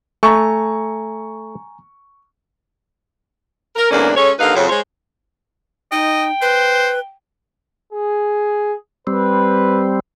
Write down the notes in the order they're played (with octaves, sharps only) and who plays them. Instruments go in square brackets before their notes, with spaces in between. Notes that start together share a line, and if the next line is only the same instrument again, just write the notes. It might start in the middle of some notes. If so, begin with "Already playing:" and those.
[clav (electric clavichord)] A3 [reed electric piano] G#5 A#5 [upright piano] C#6
[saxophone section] A#4
E2 G#2 D3 A#3 C#4 D4
G#3 C#4 A4 C#5
D#2 D3 A#3 D#4 B4 F5
F2 C#3 F#3
G#3 C5 C#5
[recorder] D#4 [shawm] D#5 [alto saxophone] G5
[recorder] B4 [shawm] C5
[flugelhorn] G#4
[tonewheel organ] G3 C4 [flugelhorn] B4